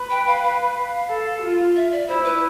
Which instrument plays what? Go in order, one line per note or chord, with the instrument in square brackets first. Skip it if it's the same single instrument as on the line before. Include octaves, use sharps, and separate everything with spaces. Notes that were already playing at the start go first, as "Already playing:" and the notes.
Already playing: [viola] B4
[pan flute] G5
F5
F5
[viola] A4
F4
[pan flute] E5
D5
[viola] E4 [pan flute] C5
[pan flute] B4